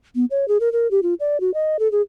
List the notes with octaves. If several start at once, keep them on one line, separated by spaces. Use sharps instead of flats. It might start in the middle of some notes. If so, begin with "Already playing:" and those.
B3
C#5
G#4
A#4
A#4
G4
F4
D5
F#4
D#5
A4
G#4